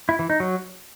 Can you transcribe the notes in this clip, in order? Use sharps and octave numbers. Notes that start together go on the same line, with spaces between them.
E4
E3
D#4
F#3